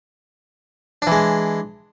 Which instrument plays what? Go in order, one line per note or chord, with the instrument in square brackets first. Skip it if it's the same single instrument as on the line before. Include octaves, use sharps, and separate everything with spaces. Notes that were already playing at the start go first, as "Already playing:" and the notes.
[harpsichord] D4
E3
G#3